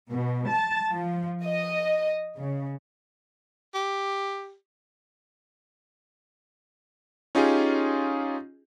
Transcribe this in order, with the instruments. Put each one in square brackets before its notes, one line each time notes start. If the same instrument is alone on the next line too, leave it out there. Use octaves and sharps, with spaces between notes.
[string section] B2
A5
F3
D#5
C#3
[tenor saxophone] G4
[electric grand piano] C#4 D#4 F4 G4 G#4